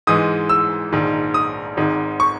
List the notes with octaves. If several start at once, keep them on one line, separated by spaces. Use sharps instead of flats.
G#2 E3 G#3 D#6
E6
A#1 G#2 D#3
D#6
G#1 G#2 D#3
C#6